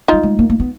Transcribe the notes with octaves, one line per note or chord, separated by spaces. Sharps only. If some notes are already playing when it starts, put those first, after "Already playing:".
G3 D#4 F4
G#3
A#3
A#3
B3